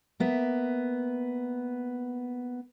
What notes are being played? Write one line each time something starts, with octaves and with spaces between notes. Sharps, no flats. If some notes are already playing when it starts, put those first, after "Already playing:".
A#3 B3 E5